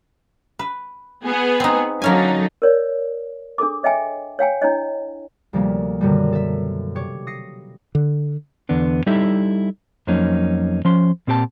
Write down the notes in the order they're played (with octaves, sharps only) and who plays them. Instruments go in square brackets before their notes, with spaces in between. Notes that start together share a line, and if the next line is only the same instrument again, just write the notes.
[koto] B4
[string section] B3 G#4
[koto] C4 D#4
[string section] D3 F#3 D#4 [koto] A#3 C#4 G#5
[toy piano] A#4 C#5 D5
D4 G#4 A4 D6
C#5 D#5 E5 G5 G#5
C#5 F5 G5 G#5
D4 E4 C#5 D#5
[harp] D2 C3 F3 G3 A#3 C#4
F#2 B2 D3 D#3 G3
A4 E5
C3 C#5 D6
D#6 A#6 C7 C#7
[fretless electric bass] D3
[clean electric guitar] E2 D3 B3 D4
G3 D#4 E4 G4 A4 E5
F2 F#3 A#3 C#4 D#4
F3 C#4 C6
A#2 C4 G4 B4 A5